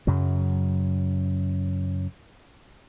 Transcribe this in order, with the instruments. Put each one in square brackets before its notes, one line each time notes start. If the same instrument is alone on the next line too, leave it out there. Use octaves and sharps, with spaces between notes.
[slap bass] F#2 C#3 F#3